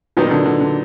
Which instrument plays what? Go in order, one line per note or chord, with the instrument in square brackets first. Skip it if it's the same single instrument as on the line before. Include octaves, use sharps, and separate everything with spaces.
[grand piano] A#2 F#3 B3 D#4 [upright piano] D#3
[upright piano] D#3
D3
D3
D3